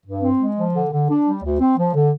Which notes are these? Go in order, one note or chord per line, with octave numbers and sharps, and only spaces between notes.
G2
C4
G#3
F3
D3
D3
D4
G3
D2
C4
F3
D3